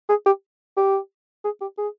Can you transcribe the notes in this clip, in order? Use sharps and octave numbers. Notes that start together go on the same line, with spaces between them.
G#4
G4
G4
G#4
G4
G#4